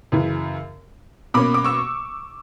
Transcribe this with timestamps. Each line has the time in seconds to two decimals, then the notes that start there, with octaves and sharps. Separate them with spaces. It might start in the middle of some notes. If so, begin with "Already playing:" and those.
0.12 F#2 C#3 E3
1.34 B2 A#3 C#4 B5 D6
1.54 D6
1.64 C#6 E6